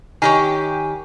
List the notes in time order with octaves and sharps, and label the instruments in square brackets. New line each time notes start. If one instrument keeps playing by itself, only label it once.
[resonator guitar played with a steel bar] D#3 G4 C#5 [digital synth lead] G#5